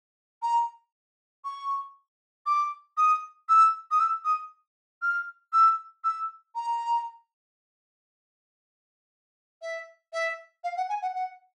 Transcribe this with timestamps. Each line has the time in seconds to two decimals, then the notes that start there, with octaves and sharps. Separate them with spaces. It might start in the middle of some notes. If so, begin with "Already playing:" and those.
0.42 A#5
1.44 C#6
2.46 D6
2.97 D#6
3.49 E6
3.91 D#6
3.99 E6
4.25 D#6
5.02 F6
5.53 E6
6.04 E6
6.55 A#5
9.62 E5
10.13 E5
10.64 F5
10.77 F#5
10.89 G#5
11.02 F#5
11.15 F#5